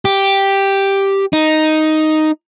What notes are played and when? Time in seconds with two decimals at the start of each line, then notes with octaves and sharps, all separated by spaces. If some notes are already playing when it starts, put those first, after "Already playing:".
0.05 G4
1.33 D#4